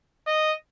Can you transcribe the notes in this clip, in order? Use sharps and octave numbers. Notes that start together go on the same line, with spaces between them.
D#5